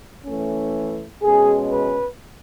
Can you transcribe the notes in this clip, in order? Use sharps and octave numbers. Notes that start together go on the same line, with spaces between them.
E3 A3 C#4
B2 G#3 C#4 G#4
B4